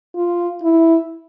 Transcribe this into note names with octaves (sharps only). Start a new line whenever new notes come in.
F4
E4